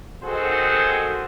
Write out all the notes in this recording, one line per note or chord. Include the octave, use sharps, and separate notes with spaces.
D#3 C4 F#4 G#4 A4 C5